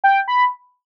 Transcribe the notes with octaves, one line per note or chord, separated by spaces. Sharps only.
G5
B5